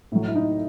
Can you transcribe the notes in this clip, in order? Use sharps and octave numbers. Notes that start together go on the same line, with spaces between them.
A2 F#3
E4
D#4